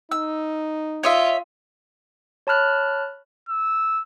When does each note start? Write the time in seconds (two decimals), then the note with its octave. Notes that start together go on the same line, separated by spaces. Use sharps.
0.11 D#4 E6
1.03 F4 C#5 D#5 E5
2.47 C#5 A5 B5 F6 F#6
3.49 E6